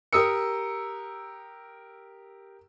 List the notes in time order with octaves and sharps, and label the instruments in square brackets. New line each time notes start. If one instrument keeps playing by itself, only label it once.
[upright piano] G4 A#4 D#6 E6 C#7